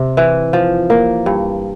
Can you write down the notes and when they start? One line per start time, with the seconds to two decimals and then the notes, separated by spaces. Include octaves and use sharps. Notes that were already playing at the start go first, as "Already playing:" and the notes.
Already playing: C3
0.17 E3
0.53 F3
0.90 A#3
1.26 G2